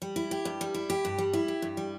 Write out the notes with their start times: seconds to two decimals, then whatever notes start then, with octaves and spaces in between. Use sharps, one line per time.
0.02 G3
0.16 E4
0.31 G4
0.45 G2
0.61 G3
0.74 E4
0.90 G4
1.05 G2
1.18 G3
1.33 E4
1.48 G4
1.62 G2
1.77 G3